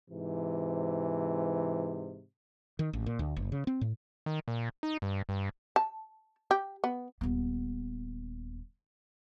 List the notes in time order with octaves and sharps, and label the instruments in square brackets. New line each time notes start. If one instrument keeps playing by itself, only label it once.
[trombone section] G#2 C3 E3
[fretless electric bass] D#3
A1
A#2
D2
F#1
C#3
C4
A2
[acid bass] D#3
A#2
D#4
G2
G2
[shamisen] A5
G4
B3
[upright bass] D#1 B3